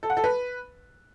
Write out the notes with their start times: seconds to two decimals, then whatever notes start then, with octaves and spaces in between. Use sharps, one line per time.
0.03 A4
0.10 F#5
0.17 A4
0.24 B4